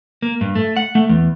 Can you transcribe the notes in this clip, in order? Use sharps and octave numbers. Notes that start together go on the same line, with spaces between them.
A#3
G2
A3
F#5
A3
E2